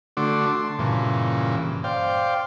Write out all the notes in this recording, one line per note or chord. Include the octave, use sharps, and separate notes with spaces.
D3 A3 D4 F#4 C6 D6
A5 C6
G2 A#2 C#3 E3
C5 D5 F5 G5